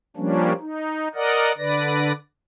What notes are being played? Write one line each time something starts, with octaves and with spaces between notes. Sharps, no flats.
F3 G3 A#3 C#4 D4
D#4
A#4 D5 D#5 F#5
D3 B4 D5 A#6